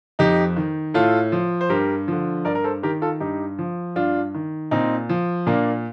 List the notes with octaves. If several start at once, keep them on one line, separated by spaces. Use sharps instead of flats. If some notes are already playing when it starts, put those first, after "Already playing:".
F2 D#4 G4
D#3
A2 F4 A4
F3
C5
G2 G4 A#4
D3 F3
G2 A#4 D5
A#4
A4 C5
D#3 G4 A#4
F4 A4
G2 D#4 G4
F3
G2 D4 F4
D#3
A#2 C4 D#4
F3
A#2 A#3 D4